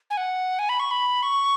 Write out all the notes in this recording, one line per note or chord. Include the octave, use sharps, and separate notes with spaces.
G#5
F#5
G#5
B5
C#6
B5
C#6